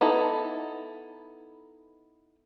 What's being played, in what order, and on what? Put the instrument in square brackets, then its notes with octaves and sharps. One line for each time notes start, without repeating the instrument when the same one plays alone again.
[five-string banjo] B3 D#4 E4 A4